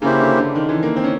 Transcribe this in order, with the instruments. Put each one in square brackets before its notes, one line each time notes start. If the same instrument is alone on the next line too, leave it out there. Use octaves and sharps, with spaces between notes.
[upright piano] C#3 [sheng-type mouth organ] A#3 C#4 E4 G4 C5
[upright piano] D3
D3
D#3
E3
A#3
C4
C#4